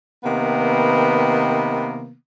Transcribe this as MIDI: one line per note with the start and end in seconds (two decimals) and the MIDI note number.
0.24 2.13 48
0.24 2.13 51
0.24 2.13 58
0.24 2.13 59